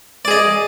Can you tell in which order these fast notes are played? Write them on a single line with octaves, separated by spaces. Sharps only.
D5 G#4 D#5